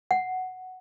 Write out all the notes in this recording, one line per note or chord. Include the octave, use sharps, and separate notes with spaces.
F#5